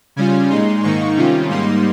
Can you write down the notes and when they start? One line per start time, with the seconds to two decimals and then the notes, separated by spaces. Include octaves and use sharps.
0.16 C#3 G3 C#4 F4 G#5
0.50 A#2 G#3 D#4 C6
0.83 G#2 D#3 A#3 D#4 C#6
1.17 C3 D#3 G3 C#4 F4
1.49 G#2 G3 A#3 D#4 C6